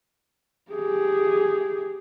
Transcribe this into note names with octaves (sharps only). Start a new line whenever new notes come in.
G4 G#4